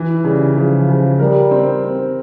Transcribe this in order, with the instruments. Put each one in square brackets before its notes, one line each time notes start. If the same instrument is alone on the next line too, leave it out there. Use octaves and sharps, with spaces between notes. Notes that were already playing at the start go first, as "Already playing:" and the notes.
Already playing: [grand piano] E3
[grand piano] C#3 [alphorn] G3
[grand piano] C#3 [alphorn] F3
[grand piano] C#3
[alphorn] G3 [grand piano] A#4
[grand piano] C4
C4